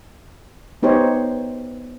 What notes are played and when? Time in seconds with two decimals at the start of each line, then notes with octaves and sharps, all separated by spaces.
0.83 B3 D#4 G4 C5 C#5